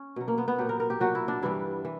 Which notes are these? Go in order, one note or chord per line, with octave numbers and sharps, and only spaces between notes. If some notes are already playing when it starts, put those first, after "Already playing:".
Already playing: C#4
B2 F#3
A#3
B3
B3
A#2 F#3 G4
A#4
A#4
G4
A#2 F#3 F#4
E4
D4
G2 E3 G3 E4
E3